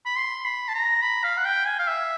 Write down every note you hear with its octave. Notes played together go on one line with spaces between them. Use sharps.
B5
C6
B5
A5
A#5
B5
F5
F#5
G5
G#5
F5
E5